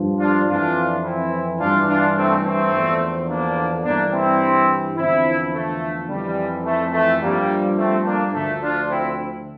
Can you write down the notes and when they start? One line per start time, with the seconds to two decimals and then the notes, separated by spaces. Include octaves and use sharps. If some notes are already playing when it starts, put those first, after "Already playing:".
Already playing: G2 F3
0.20 D4 F4
0.48 F2 E3 D4 F4
1.04 C4 E4
1.60 G2 E3 D4 F4
1.88 D4 F4
2.16 A3 C4
2.44 A3 C4
2.72 E2 D3 F3
3.29 A#3 D4
3.85 G2 E3 A#3 D4
4.13 C4 E4
4.97 E2 D3 F3 C4 E4
5.53 A3
6.09 F2 E3 G3
6.66 A3
6.93 A3
7.22 G2 F3 G3 A#3
7.77 A3 C4
8.06 A#3 D4
8.34 D2 D3 F3 A3
8.62 D4 F4
8.90 C4 E4